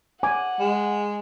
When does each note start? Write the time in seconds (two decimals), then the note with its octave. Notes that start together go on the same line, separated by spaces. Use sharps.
0.23 F#5 G#5 D6
0.60 G#3